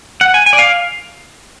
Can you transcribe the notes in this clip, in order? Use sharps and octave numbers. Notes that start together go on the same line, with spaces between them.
F#5
G#5
G#5
D5
F5